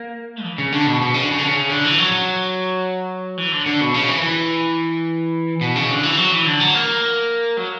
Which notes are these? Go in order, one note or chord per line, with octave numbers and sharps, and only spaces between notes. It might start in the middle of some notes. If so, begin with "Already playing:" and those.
Already playing: A#3
E3
C#3
D3
B2
B2
C#3
D3
C#3
D3
C#3
D3
E3
F#3
F#3
E3
D3
D3
B2
C#3
E3
E3
B2
C#3
D3
E3
F#3
E3
D3
F#3
A#3
F#3